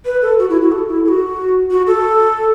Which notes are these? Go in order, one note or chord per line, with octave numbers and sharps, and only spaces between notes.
B4
A4
F#4
E4
F#4
A4
E4
A4
F#4
F#4
A4